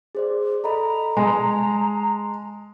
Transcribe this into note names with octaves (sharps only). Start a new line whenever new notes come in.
G#4 C5 D5
A4 D#5 A#5 B5
G#3 G#5 A5